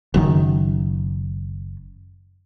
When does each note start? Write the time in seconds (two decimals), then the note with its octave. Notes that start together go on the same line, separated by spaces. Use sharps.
0.14 F#1 F#2 D#3